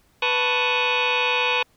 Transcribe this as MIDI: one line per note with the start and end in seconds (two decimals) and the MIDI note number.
0.22 1.62 71
0.22 1.62 81
0.22 1.62 85
0.22 1.62 87
0.22 1.62 90